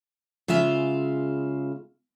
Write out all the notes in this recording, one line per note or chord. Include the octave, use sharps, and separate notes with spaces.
C#3 G#3 F4 E5 F5